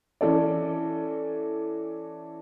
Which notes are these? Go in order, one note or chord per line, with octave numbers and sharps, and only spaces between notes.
E3 C#4 A4 D5